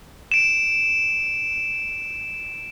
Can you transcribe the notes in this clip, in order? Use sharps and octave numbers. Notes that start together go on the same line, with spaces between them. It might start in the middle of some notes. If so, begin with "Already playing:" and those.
D7 E7